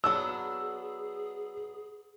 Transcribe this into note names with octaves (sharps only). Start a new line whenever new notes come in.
F#3 B3 D4 G#4 E6